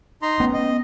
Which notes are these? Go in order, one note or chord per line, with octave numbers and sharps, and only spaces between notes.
D#4 A#5 C6
B3 C#4
D#5